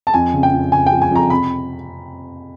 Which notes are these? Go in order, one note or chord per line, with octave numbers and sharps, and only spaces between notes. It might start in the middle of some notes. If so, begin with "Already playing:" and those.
A5
F2 G#5
C#3
G5
F2
C#3 G#5
G5
F3
G#5
F2 A#5
C3 B5